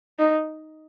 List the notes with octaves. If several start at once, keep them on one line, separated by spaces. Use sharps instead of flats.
D#4